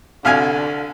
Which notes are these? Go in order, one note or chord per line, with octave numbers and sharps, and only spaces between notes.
C2 D3 F5 G#5